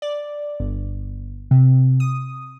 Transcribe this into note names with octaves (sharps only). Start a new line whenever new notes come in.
D5
G1
C3
D#6